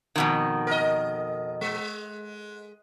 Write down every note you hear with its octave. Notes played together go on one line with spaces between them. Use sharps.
F2 B2 D#3
A#4 D#5
G#3